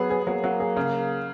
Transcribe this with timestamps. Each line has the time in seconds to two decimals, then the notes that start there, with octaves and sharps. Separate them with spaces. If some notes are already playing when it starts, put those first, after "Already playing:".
Already playing: F#3 B3 G#4
0.10 G#4
0.26 F#3 A#3
0.44 F#3
0.60 G#4
0.77 C#3